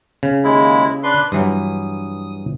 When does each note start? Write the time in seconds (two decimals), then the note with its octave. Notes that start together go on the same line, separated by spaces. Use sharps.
0.23 C#3
0.44 D#2 G#3 E4
1.03 D4 B4 C6
1.32 G2 E3 F#3 D#6